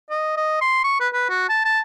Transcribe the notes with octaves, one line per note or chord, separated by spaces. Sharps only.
D#5
D#5
C6
C#6
B4
B4
F#4
A5
A5